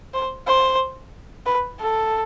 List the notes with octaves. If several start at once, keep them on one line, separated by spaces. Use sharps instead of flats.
C5
C5
B4
A4